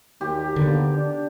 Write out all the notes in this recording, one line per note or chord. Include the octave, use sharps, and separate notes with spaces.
D#2 G4
D3 A#3 B3
D4